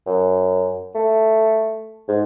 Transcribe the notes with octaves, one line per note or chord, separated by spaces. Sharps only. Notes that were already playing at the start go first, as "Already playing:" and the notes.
F#2
A3
G#2